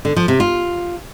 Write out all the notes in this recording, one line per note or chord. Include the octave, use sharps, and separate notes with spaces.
D3
F3
C3
F4